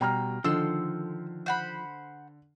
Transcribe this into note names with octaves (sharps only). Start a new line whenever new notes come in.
B2 G3 G5 A#5 F6
D3 D#3 F3 A4 C6 E6
C5 F#5 B5